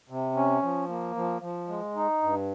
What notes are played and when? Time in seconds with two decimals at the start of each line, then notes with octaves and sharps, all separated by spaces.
0.10 C3
0.36 C#4
0.62 F3
0.89 A#3
1.16 F3
1.42 F3
1.68 G#3
1.96 D#4
2.22 G2